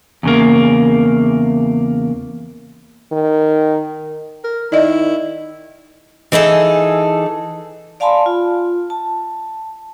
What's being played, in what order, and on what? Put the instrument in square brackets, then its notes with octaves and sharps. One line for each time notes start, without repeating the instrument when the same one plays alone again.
[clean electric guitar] E2 C#3 A#3
[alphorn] D#3
[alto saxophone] A#4
[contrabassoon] D#3 [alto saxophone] E4 [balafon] D5 D#5
[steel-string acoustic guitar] E3 D#4 G#4 A4
[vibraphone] D5 F5 G#5 A5 B5 C6
F4
A5